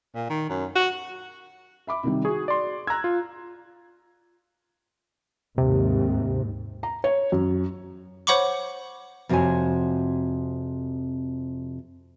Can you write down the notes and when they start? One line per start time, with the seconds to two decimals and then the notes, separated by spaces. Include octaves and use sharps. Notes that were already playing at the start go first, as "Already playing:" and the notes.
0.15 A#2
0.29 D#3
0.49 F#2
0.75 F#4
1.87 E5 B5 D6
2.03 C3 D#3 G3
2.25 F#4 G#4 C#6
2.48 D5 C6
2.87 A#5 E6 F#6 G#6
3.04 F4
5.58 D#2 G#2 C3
6.83 A#5
7.04 C#5
7.32 F#2
8.27 C5 C#5 F#5 B5 C#6 D6
9.29 F2 C3 F#4 C5 C#5 G#5